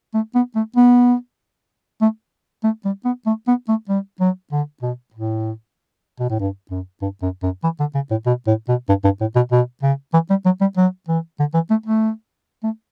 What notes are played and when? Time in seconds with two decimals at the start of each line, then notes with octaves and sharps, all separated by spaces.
0.14 A3
0.35 B3
0.55 A3
0.76 B3
2.01 A3
2.64 A3
2.85 G3
3.05 B3
3.26 A3
3.48 B3
3.68 A3
3.89 G3
4.20 F#3
4.52 D3
4.82 B2
5.14 A2
6.20 B2
6.30 A2
6.39 G2
6.71 F#2
7.02 G2
7.22 F#2
7.43 F#2
7.64 E3
7.80 D3
7.95 C#3
8.11 A2
8.26 B2
8.47 A2
8.68 B2
8.89 G2
9.04 G2
9.21 A2
9.36 B2
9.52 B2
9.83 C#3
10.14 E3
10.30 G3
10.45 F#3
10.61 G3
10.77 F#3
11.08 E3
11.40 D3
11.54 E3
11.71 A3
11.86 A3
12.64 A3